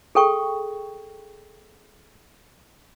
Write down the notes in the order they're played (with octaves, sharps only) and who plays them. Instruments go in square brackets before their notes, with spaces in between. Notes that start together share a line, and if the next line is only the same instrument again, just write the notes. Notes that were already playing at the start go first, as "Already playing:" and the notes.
[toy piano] G#4 A4 G5 C#6